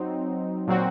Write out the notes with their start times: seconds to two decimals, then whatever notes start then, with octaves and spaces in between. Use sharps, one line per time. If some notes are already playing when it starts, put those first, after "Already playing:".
Already playing: F#3 C4 D#4
0.68 A#2 F#3 C4 F#4